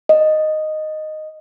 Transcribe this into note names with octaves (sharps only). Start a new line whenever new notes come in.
D#5